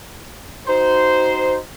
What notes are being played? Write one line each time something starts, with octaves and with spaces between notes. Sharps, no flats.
D#4 F#4 C5